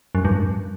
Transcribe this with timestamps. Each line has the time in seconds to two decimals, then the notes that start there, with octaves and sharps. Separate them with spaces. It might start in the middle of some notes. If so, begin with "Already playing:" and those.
0.15 F#2
0.25 G2